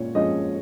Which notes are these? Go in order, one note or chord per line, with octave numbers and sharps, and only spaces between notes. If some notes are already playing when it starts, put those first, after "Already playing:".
Already playing: A#2 G#3 C#4 C#5
F3 G#3 C#4 D#5